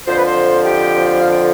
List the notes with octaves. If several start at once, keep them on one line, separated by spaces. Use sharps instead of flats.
F2 D3 F3 C5
B4
C5
G4
F5
G5